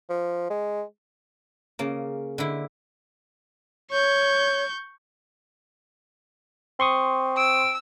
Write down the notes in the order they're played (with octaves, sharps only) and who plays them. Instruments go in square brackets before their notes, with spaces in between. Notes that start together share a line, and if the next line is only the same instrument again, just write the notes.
[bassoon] F3
G#3
[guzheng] C#3 A#3
D3 E4
[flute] C#5 [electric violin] C#6 G6
[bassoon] C4 [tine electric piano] C6 C#6 D#6
[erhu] E6 [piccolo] D7